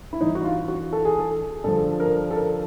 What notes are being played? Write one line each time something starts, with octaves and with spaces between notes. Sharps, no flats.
E4
G2 E3 D#4
F#4
F4
F#4
A4
G#4
A4
G2 D3 F3 A4
A#4
A4
A#4